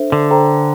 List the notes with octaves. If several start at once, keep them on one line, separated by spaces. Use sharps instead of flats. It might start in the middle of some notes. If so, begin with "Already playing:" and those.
Already playing: D4 A4 C5 E5
D3
A4 C5 G5 A#5